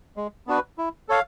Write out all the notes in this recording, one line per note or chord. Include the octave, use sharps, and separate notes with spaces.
G#3
B3 D4 F#4 B4
E4
A4 C#5 F5